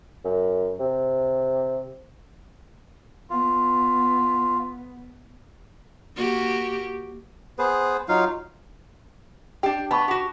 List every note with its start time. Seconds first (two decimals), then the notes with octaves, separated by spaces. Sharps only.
0.25 F#2
0.80 C3
3.30 B3 F4
6.16 A#3 F#4 G4
7.58 B3 G#4 B4 C5
8.09 F#3 D#4 F4 F5
9.63 D4 G4 G5
9.91 B3 A5 B5 C#6
10.08 F#4 G4